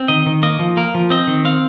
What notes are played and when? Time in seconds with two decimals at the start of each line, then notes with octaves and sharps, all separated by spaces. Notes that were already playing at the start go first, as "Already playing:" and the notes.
Already playing: C4
0.08 D#3 D#5
0.26 D#3
0.43 A#3 D#5
0.59 F3
0.77 A#3 A#4
0.95 F3
1.10 C4 D#5
1.27 D#3
1.45 C4 F5